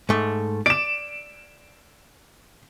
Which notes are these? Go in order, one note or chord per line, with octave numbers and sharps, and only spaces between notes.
G#2 A3
D5 D7 E7